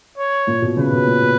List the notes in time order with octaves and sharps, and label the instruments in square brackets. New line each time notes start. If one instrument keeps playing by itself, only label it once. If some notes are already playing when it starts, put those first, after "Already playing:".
[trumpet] C#5
[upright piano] A#2
B2
[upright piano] C#3 [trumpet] B4
[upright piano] B2
A#2
A#2